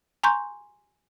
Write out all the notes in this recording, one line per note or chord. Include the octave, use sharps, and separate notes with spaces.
G#5 A#5 C6 C#6 G6